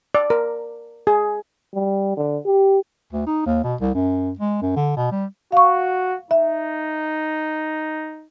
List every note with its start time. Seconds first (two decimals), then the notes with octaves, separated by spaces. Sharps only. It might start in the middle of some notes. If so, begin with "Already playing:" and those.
0.15 D5
0.30 A#4
1.07 G#4
1.74 G3
2.17 D3
2.45 G4
3.12 D2
3.27 D#4
3.46 D#2
3.64 B2
3.81 C2
3.94 F#2
4.39 G#3
4.62 F#2
4.76 D3
4.97 B2
5.12 G3
5.52 F#4 F5 C#6
6.31 D#4 E5